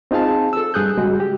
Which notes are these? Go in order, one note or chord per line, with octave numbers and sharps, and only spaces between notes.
C4 D#4 F4 G#4 F5 A5
A4 E6
G2 G#4 D#6 F#6 G6
C#3 G3 G#3 F#4
G4